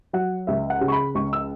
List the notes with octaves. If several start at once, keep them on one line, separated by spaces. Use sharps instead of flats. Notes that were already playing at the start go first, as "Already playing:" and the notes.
F#3 F#5
C#2 E5
F#5
C#3
C#6
B5
C#2 C#6
E6